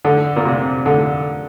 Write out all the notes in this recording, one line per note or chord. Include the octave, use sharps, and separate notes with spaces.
D3
A#2
C3
D3